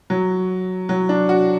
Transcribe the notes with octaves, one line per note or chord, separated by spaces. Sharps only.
F#3
F#3
D4
F#4